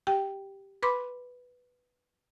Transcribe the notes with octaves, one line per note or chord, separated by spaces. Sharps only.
G4 G5
B4 B5 C6 D6